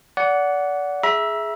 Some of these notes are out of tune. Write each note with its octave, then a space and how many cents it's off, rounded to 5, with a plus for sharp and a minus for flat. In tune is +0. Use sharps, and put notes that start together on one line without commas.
D5 -30 F#5 +0
G#4 +15 E5 +0 A#5 +40